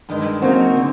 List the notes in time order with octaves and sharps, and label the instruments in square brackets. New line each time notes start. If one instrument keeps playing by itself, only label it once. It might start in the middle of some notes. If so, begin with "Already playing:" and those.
[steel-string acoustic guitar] G2 D#3 G#3
[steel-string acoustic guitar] C#3 F#3 A#3 D#4 F#4 [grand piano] C4
[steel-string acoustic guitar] D3